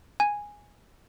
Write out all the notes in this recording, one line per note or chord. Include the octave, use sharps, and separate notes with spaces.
G#5